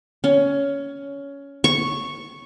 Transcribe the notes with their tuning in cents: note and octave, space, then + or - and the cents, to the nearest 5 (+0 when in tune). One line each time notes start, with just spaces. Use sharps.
C#4 +15
C#6 -5